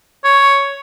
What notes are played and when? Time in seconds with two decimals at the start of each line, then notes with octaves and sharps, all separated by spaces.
0.24 C#5